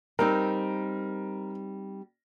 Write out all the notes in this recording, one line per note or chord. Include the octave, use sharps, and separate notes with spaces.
G3 C4 D#4 A#4